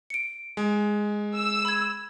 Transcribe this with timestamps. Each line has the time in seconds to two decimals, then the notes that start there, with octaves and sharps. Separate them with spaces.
0.10 C#7 D7
0.57 G#3
1.34 E6
1.65 B5 G#6